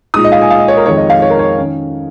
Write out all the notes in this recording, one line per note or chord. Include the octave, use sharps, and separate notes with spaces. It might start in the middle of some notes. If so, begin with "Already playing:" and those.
A#2 G#3 D#4 D#6
D#5
F5
G#5
F5
D#5
C#5
A#4
F2 D#3 G#3 D#4 C#5
D#5
F5
C#5
A#4
C#5
D#3 C#4